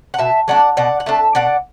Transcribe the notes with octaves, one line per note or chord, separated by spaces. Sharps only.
F#5
B2 E5 A5
F#3 A3 D4 D5 F#5
B2 D5 F#5
F#5
A3 D4 E5 A5
B2 D5 F#5